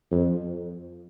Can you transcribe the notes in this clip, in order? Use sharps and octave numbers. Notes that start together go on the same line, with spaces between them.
F2